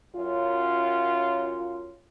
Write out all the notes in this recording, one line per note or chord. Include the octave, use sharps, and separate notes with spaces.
F#2 F4